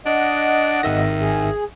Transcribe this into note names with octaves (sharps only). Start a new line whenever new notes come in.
D4 D#5 F#5
G#1 D#3 E5 A#6
G#4